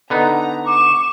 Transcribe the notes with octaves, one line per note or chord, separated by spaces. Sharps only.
D3 B3 D#4 A#5
C#6 D6 E7